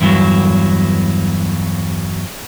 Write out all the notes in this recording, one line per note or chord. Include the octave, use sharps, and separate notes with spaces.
E2 G2 E3 F#3